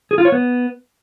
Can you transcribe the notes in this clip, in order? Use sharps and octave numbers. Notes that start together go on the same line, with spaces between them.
G#4
F4
C#5
B3